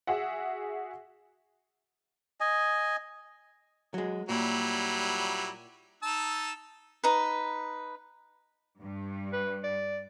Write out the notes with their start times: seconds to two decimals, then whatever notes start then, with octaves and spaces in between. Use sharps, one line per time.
0.07 F#4 G#4 E5 F#5
2.40 D#5 G#5
3.94 F#3 G#3
4.29 A#2 F#3 G3 E4
6.03 D#4 A5 E6
7.04 D#4 B4
8.80 G2
9.33 B4
9.63 D5